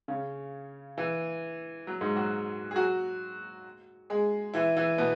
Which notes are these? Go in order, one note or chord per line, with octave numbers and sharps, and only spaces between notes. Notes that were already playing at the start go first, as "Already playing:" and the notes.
C#3 C#4
E3
F#3
G#2 G#3
F#3 F#4
G#4
F#3 F#4
G#3 G#4
E3 E4
E3 E4
B2 B3